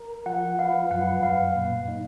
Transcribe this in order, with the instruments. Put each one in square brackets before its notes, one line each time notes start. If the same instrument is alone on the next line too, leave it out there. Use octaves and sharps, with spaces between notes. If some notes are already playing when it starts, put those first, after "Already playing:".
Already playing: [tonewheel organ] A#4
[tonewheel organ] F3 [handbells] F#5
[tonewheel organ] B4 [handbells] F5
[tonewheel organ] F#2 [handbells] F#5
[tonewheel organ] F#2 [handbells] F5
[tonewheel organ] A#2
D#4